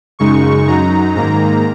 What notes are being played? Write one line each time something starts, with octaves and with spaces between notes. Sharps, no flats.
F#2 C#3 G#3 D#4 C#6
F#2 F#3 D#4 A#5
G#2 D#3 A#3 A#5